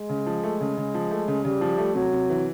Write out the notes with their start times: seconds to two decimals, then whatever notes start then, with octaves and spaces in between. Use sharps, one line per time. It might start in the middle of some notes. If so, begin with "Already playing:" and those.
Already playing: G#3
0.09 C#3
0.26 F3
0.43 A3
0.61 C#3
0.77 C#3
0.94 F3
1.11 A3
1.28 C#3
1.45 C#3 G3
1.61 F3
1.78 A3
1.95 C3 F#3
2.13 C3
2.29 E3